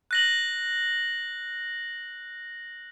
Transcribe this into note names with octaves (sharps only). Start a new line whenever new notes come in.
F#6 A#6 F#7